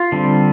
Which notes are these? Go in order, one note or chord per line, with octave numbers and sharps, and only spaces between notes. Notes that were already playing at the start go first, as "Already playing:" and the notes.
Already playing: F4
D3 G3 C4